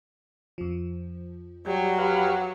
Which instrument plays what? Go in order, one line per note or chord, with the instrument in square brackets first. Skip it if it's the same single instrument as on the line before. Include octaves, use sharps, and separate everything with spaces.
[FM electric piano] F2 F3
[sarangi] F#3 [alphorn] G3 [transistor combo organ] G4
[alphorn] G4 [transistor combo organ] B4 F5 F#5